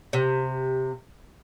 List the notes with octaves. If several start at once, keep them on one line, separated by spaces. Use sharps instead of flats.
C3